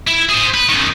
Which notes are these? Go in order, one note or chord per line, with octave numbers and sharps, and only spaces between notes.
E4
G#4 C5
B4
F#2 D#3